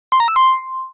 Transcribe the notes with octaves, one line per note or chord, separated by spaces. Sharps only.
C6
A#5
E6
C6